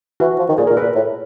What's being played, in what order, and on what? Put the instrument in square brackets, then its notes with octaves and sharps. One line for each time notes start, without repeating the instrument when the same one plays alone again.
[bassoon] E3 [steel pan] F#4
[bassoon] F3
D#3
[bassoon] A#2 [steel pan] G#4
[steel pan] A#4
[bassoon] A#2
[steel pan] B4
[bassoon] A#2
A2